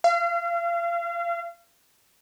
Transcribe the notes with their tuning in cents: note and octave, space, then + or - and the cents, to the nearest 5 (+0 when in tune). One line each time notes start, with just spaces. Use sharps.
F5 -35